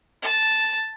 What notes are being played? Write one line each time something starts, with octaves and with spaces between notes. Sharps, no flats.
A5